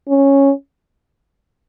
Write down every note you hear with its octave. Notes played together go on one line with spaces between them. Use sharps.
C#4